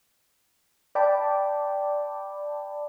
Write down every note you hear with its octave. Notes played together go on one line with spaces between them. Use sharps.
D5 G5 A5 B5 D6